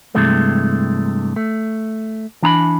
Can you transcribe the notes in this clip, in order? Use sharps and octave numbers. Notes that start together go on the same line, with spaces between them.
G2 C3 E3 G#3 A3
A3
E3 D4 A#5 B5